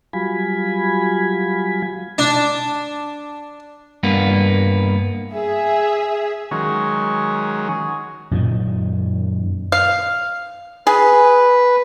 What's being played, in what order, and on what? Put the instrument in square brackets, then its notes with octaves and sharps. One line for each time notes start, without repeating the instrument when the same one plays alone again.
[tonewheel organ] F#3 G3 F4 G#5 B5
[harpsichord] D4
[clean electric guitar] G2 A#3 B3
[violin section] G#4 E5
[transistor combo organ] D#3 F#3 G#3 C#4
[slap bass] F#2 A#2 D#3
[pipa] F5
[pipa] G#4 [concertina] B4